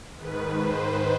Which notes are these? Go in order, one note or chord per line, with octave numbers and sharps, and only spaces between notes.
G#2 D#3 B4
C5